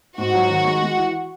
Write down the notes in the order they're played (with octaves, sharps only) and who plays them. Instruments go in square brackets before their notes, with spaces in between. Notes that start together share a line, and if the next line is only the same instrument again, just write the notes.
[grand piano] G#2 [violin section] F#4
[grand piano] F#3
D#3
G#3
G#3
E3